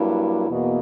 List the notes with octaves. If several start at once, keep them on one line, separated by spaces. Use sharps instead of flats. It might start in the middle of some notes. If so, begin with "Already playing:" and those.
Already playing: G2 F#3 A#3 E4
E2 B2 A#3